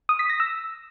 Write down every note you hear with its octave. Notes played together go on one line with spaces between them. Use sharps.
D#6
B6
A#6
E6